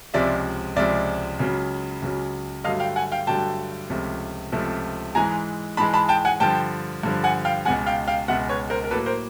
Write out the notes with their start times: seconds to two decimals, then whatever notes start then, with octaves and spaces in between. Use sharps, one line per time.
0.14 C#2 C3 F3 G#3 D5 E5
0.76 C#2 C3 F3 G#3 D5 E5
1.39 C#2 C#3 F#3
2.02 C#2 C#3 F#3
2.64 G2 D3 F#3 A3 D#5 F5
2.80 F5 G5
2.96 F#5 G#5
3.12 F5 G5
3.27 G2 D3 F#3 A3 G5 A5
3.90 C#2 C3 F3 A3
4.52 C#2 C3 F3 A3
5.15 G#2 E3 G#3 G#5 A#5
5.77 G#2 E3 G#3 A5 B5
5.94 A5 B5
6.09 G5 A5
6.25 F#5 G#5
6.40 G2 D3 F3 G5 A5
7.03 G2 D3 F3
7.24 F#5 G#5
7.45 F5 G5
7.65 C#2 B2 G#3 F#5 G#5
7.86 F5 G5
8.08 F5 G5
8.28 C#2 B2 G#3 E5 F#5
8.49 B4 C#5
8.70 A#4 C5
8.84 A#4
8.91 A2 F#3 A#3 A4 B4
9.06 A#4 C5